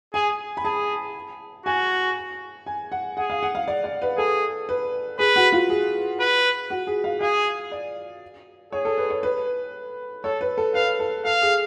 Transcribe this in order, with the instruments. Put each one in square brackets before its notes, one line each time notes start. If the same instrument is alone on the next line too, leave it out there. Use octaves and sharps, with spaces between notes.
[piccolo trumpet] G#4 [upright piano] G#5
[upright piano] B5
[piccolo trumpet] G#4 [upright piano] A5
[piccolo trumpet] F#4 [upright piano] G#5
[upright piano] G#5
F#5
[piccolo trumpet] G#4 [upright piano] F#5
[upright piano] F5
F#5
F5
D5
D5
B4
[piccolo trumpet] G#4 [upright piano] A4
[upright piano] B4
[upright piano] G#4 [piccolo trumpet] B4
[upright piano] F#4
F4
G#4
[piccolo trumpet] B4
[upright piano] F#4
G#4
F5
[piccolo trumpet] G#4 [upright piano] F5
[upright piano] D5
[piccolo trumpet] G#4 [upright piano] C#5
[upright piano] A4
B4
C#5
B4
[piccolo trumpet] A4 [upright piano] C#5
[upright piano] B4
A4
[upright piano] B4 [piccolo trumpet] F5
[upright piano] A4
[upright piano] A4 [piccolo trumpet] F5
[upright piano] G#4